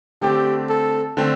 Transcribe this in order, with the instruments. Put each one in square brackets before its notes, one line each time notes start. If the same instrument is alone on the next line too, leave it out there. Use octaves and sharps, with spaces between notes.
[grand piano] D3 A3 C4 [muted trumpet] G4
[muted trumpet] A4
[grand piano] D3 A3 C4